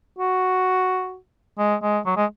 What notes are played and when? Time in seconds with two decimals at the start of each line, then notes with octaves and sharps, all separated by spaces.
0.19 F#4
1.59 G#3
1.83 G#3
2.06 F#3
2.17 G#3